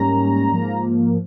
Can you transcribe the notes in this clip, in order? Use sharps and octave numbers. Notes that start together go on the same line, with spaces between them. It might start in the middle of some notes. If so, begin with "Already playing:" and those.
Already playing: G#2 G3 A#3 C#4 A#5
G#2 F3 A#3